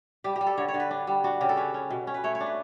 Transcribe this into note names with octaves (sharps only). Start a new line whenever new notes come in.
G3 G4
G4
G3
A4
D3 C#5
C#5
D3
B4
D4
G3
D4 F#4
C#3 G4
A4
C#4 B4
C#4
B2
C#4
B4
A3 C#5
C#5
D4
B4